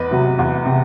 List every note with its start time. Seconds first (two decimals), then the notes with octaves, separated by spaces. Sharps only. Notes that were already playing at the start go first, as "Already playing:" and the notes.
Already playing: E2 B4 D#5
0.11 C3 F#3
0.39 E2
0.66 C3